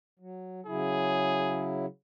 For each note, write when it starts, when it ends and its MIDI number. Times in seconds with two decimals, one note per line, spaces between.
0.20 0.61 54
0.66 1.86 49
0.66 1.86 54
0.66 1.86 64
0.66 1.76 68